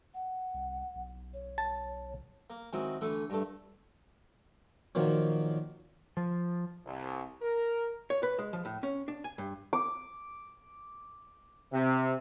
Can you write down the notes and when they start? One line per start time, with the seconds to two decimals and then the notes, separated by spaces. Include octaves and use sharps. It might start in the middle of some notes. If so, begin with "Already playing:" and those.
0.14 F#5
0.54 C2
0.95 B1
1.33 C#5
1.58 A5
2.50 A#3
2.73 D#3 F#3 G#3 C4 E4
3.01 D3 E3 A3
3.30 G2 A3
4.95 A#2 D#3 F3 F#3
6.17 F3
6.86 C2
7.42 A#4
8.10 C#5
8.23 B4
8.39 G#3
8.53 F3
8.65 A2
8.83 C#4
9.08 D4
9.24 G#5
9.38 G2
9.73 D6
11.73 C3